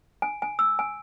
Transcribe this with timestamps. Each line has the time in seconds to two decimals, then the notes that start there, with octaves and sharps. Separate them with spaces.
0.22 G#5
0.42 G#5
0.59 E6
0.79 G#5